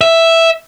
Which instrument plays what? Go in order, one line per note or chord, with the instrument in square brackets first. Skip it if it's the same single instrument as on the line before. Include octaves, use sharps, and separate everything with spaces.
[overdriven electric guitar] E5